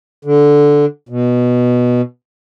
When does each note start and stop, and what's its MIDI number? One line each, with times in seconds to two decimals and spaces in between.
0.25 0.85 50
1.09 2.01 47